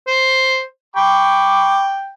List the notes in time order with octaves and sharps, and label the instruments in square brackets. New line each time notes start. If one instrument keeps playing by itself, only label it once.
[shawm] C5
[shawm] G5 [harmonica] B5 C#6 D6